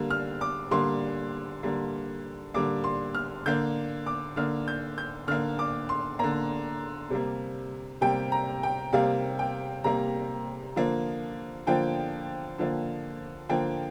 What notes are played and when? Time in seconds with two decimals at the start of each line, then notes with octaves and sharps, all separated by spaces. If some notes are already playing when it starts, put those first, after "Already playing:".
Already playing: D3 G3 A#3
0.10 F6
0.41 D6
0.71 D3 G3 A#3 C6
1.63 D3 G3 A#3
2.54 D3 G3 A#3 D6
2.84 C6
3.15 F6
3.46 D3 A#3 G6
4.06 D6
4.36 D3 A#3 F6
4.68 G6
4.98 G6
5.28 D3 A#3 F6
5.59 D6
5.89 C6
6.19 D3 A#3 A#5
7.10 C3 G3 A#3
8.01 C3 G3 A#3 G5
8.32 A#5
8.63 G5
8.93 C3 G3 A#3 F5
9.39 G5
9.84 C3 G3 A#3 A#5
10.76 D3 F3 A#3
11.67 D3 F3 A#3 G5
12.58 D3 F3 A#3
13.49 D3 F3 A#3 G5